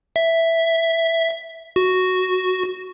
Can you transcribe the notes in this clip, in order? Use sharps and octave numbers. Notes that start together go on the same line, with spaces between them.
E5
F#4